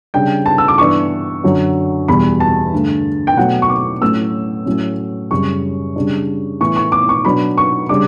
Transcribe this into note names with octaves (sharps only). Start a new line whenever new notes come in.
C#3 G3 D4 G5
A5
E6
D6
G2 E3 B3 D4 C#6
F#2 D3 F#3
E2 B2 G3 B5
A5
G2 D3 A3
G5
B2 F#3 A3 F#5
C#6
D6
A2 F#3 A3 C#4 E6
A2 F#3 A3 C#4
F#2 C#3 G3 C#6
C#3 G3 D4
A2 E3 B3 C#6
C#6
D6
C#6
B2 F#3 B3 D4 B5
C#6
C#3 G3 D4 D6